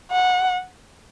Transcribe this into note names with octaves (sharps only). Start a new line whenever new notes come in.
F#5